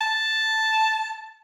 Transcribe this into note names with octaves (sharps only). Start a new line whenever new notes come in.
A5